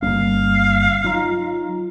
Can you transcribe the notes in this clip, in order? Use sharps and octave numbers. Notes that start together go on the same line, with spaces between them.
G1 G3 A#3 C#4 F5
F#3 D#4 F4 A#5